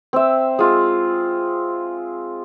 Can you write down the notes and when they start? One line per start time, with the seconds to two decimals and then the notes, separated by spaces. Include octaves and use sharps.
0.13 C4 E5
0.59 G#3 F4